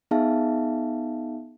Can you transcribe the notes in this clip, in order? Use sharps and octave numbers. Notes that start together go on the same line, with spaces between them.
B3 D#4 G#4 E5 F5 A5